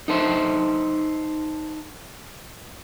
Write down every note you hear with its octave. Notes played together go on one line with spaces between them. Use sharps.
D#4 A4 C5 E5